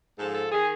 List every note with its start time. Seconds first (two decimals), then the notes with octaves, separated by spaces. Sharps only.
0.19 G#2 F3 A4
0.35 A4
0.52 D#3 G#4